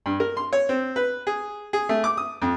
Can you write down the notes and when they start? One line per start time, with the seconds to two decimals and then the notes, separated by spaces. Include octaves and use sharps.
0.06 G2
0.20 A#4
0.37 C6
0.53 C#5
0.69 C4
0.96 B4
1.27 G#4
1.73 G#4
1.89 A3
2.04 D6
2.17 D#6
2.42 F2